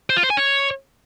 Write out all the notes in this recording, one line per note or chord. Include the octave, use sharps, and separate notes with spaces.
C5
F4
C5
G#5
C#5